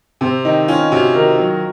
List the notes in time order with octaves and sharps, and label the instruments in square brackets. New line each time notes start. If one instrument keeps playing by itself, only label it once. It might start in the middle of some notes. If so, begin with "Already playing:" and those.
[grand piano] C3 [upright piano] C4
[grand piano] D#3 [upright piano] D#4
[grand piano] C#4 [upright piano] F4
[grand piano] C3 [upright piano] F#4
[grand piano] D#3 [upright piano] A#4
[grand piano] F#3